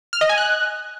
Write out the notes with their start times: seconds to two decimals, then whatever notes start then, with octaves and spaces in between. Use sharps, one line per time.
0.13 F6
0.21 D#5
0.29 G#5
0.38 F#6